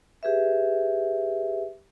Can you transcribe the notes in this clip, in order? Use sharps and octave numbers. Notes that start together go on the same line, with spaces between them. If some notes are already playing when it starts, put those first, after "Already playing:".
G4 G#4 B4 E5